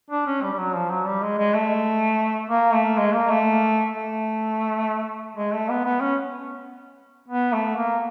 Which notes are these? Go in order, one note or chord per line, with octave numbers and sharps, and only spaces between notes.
D4
C#4
G3
G3
F#3
F3
F#3
G3
G#3
G#3
A3
A#3
A3
G#3
A#3
A3
A3
G#3
A3
B3
B3
C#4
B3
A3
A#3